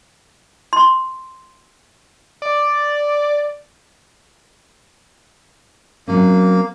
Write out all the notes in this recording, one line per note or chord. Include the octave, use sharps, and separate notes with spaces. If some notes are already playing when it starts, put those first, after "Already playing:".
C6
D5
F#3 A#3 C4 C#4